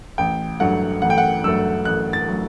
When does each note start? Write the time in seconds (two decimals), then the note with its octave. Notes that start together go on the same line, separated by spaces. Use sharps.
0.18 A1 G5
0.60 G2 F#3 A3 F#5
1.02 A1 F#5
1.10 G5
1.18 F#5
1.43 G2 F#3 A3 E6
1.85 A1 F#6
2.13 A6
2.28 F#3 A3